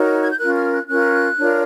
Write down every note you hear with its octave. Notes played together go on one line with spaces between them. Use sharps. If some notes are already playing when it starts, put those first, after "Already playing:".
Already playing: D#4 F#4 A#4 C#5
G#6
G6
C#4 F4 A#4 F#6
F6
F#6
C#4 F4 A#4 F#6
D4 F4 A#4 C#5